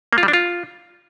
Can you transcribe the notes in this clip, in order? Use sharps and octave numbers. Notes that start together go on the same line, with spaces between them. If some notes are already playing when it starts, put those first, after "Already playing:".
A#3
F4
G3
D4
F4